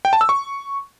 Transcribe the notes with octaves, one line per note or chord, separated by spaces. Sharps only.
G5
A5
E6
C#6